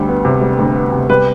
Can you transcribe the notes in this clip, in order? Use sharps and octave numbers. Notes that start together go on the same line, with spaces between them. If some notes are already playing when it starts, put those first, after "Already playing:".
Already playing: D2 G3
B3
C3
G3
D2
B3
C3
G3 B4